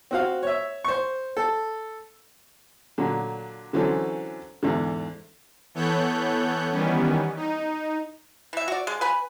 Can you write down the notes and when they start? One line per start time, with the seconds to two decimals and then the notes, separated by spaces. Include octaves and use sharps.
0.11 C4 F#4 F5
0.43 C#5 E5
0.84 C5 C#6
1.37 A4
2.98 A#2 D3 F#3
3.73 D3 E3 F#3 C4 C#4 A4
4.63 E2 G#2 D3
5.74 E3 B3 A4 C#5 F#6 G6
6.71 D#3 E3 G3 B3 C#4
7.36 D#4
8.53 E3 E5
8.68 F#4 D5
8.87 G#3
9.01 B4 G#5 B5